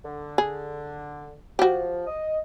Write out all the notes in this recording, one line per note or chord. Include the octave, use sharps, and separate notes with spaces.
D3
G#4
F3 F#4 G4
D#5